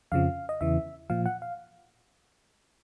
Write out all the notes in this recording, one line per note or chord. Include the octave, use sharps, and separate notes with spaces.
F2 C#3 F3 F5
D#5
E2 C#3 E3 E5
A#2 F3 F5
F#5
F5